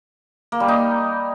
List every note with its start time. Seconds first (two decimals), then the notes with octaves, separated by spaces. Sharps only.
0.52 A#3
0.60 G3
0.68 D#4